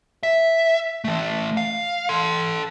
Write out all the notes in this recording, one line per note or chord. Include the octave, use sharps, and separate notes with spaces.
E5
E3 A3
F5
A4 C6